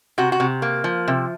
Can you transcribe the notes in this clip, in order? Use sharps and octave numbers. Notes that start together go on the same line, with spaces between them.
C3 F#4
F#4
C3
A#3
F3
C3